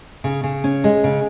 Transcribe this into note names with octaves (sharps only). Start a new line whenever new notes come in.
C#3
C#3
C#4
G#3
C#3